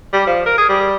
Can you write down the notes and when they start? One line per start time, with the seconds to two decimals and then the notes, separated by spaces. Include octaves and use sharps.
0.13 G3
0.27 F3
0.46 A#4
0.58 G#4
0.69 G3